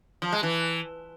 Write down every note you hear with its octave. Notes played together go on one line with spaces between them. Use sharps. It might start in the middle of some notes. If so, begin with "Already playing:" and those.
F3
G#3
E3